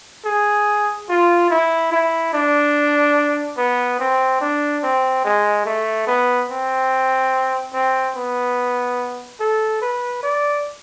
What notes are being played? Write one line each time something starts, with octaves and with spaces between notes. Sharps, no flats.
G#4
F4
E4
E4
D4
B3
C4
D4
C4
G#3
A3
B3
C4
C4
B3
A4
B4
D5